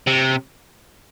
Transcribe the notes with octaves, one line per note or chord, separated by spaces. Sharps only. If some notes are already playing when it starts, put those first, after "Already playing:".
C3